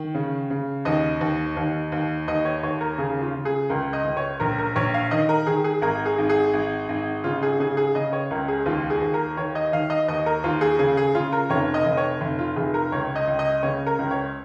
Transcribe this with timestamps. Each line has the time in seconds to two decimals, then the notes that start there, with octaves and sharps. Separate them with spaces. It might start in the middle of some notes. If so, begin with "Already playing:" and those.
Already playing: D#3
0.15 C#3
0.50 C#3
0.85 D#2 D#5
1.21 D#2
1.57 D#2
1.92 D#2
2.28 D#2 D#5
2.45 C#5
2.63 D#2 C#5
2.81 A#4
2.98 C#3 G#4
3.22 F4
3.34 C#3
3.45 G#4
3.70 C#2 A#4
3.93 D#5
4.04 C#2
4.17 C#5
4.40 A#1 A#4
4.58 A#4
4.76 A#1 C#5
4.94 F5
5.11 D#3 D#5
5.29 A#4
5.47 D#3 G#4
5.64 G#4
5.82 G#1 A#4
6.06 G#4
6.18 G#1
6.29 G#4
6.53 G#1
6.89 G#1
7.24 C#3 F4
7.43 G#4
7.60 C#3 G#4
7.77 G#4
7.95 C#3 D#5
8.13 C#5
8.31 C#2 A#4
8.48 G#4
8.66 D#2 F4
8.90 G#4
9.01 D#2
9.14 A#4
9.37 D#3 C#5
9.55 D#5
9.73 D#3 F5
9.90 D#5
10.08 D#2 D#5
10.26 A#4
10.44 D#2 F4
10.61 G#4
10.79 C#3 G#4
10.97 G#4
11.15 C#3 F4
11.33 A#4
11.50 F1 C#5
11.74 D#5
11.85 F1
11.97 C#5
12.21 F1
12.39 F4
12.56 F1 G#4
12.74 A#4
12.92 C#2 C#5
13.16 D#5
13.27 C#2
13.39 D#5
13.63 C#3 C#5
13.87 A#4
13.99 C#2
14.11 C#5